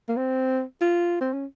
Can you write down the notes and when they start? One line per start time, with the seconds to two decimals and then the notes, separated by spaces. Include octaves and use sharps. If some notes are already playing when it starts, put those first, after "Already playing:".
0.09 A#3
0.17 C4
0.81 F4
1.21 C4
1.33 C#4